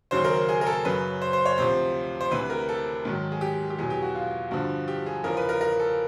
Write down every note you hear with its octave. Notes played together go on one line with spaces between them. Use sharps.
D#2 C#3 F#3 C5
A#4
G#4
A#4
A4
F#2 C#3 F#3 B4
C5
C5
C#5
D2 C3 F3 C5
C5
D2 C3 E3 B4
A#4
A4
G#2 D#3 F#3
G#4
G4
G4
E2 B2 F#3 G#4
G4
F#4
F4
G2 D3 F3 F#4
G4
G#4
E2 C#3 F3 A#4
B4
A#4
A#4
A4